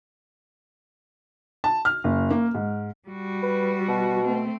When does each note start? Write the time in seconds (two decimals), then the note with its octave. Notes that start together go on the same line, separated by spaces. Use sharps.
1.64 A5
1.85 F6
2.04 F#1
2.31 A#3
2.55 G#2
3.09 G3 F#4
3.43 B4
3.88 B2
4.25 A3 C4